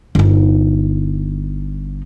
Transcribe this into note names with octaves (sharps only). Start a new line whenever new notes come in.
G1 D#4